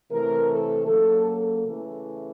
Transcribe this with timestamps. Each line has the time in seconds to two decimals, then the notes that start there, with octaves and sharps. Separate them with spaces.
0.10 C3 E3 A3 A#4
0.49 A4
0.88 C#3 F#3 A#3 A4
1.26 A4
1.66 C#3 E3 A3